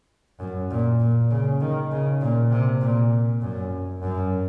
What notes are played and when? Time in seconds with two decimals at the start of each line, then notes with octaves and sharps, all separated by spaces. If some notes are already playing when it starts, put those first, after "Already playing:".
0.40 F#2
0.71 A#2
1.00 A#2
1.31 C#3
1.61 D#3
1.92 C#3
2.21 A#2
2.51 C3
2.81 A#2
3.42 F#2
4.02 F#2